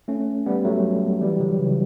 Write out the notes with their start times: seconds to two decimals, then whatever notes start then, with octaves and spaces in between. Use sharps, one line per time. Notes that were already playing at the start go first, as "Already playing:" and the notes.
0.08 A3 C#4
0.46 G3 B3
0.65 F#3 A3
1.21 E3 G3
1.40 D3 F#3
1.59 C#3 E3